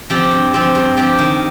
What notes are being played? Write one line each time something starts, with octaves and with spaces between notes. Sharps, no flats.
F3 C4 G4
G2
F3 C4 G4
G2
F3 C4 G4
D#3